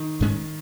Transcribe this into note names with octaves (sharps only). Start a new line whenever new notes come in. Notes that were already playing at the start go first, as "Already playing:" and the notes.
Already playing: D#3
G#2 G#3 C#4